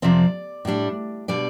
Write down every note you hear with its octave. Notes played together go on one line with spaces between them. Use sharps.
F2 C3 F3 C4 D5
A2 G3 D4
B2 G3 D4 D5